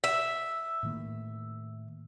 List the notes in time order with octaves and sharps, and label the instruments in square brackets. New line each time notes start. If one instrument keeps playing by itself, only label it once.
[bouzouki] E5
[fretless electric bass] A2 D#3 A#3